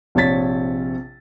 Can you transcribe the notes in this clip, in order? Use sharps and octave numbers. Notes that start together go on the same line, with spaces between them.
A#1 C3 C#5 G#6 A6 B6